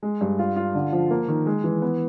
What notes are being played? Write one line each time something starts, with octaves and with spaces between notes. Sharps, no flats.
G#3
G2
F4
F4
D3
F3
A#3
D#3
G#3
E3
B3